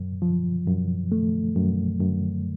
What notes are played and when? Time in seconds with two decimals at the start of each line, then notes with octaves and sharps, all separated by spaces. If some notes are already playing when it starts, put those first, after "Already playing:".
Already playing: F#2
0.22 F3
0.67 F#2
1.12 A3
1.56 F#2
2.00 F#2